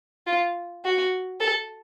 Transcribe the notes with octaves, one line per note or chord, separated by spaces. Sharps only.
F4
F#4
A4